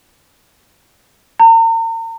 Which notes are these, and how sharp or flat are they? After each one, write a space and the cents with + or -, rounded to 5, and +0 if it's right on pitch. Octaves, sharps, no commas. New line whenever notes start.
A#5 -40